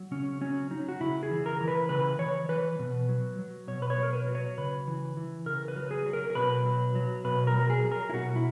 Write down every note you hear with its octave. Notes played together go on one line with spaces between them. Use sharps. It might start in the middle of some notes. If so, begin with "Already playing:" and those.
Already playing: F#3
C#3 C#4
F#3 C#4
F#3 D#4
F#4
C#3 E4
G#4
E3
A#4
E3
B4
C#3 B4
E3 C#5
E3 B4
B2
F#3
F#3
B2 C#5
B4
C#5
F#3
A#4
B4
F#3
C#5
C#3 B4
E3
E3
C#3 A#4
B4
F#3
G#4
F#3
A#4
A#4
B2 B4
F#3
F#3
B2 B4
A#4
F#3
G#4
F#3
A#4
E4
B2 F#4
E4